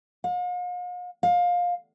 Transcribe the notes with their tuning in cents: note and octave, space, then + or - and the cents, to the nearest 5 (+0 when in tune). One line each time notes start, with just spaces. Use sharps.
F5 +45
F5 +20